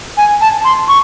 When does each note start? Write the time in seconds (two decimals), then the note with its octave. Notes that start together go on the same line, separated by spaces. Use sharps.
0.17 G#5
0.41 A5
0.65 C6
0.88 C#6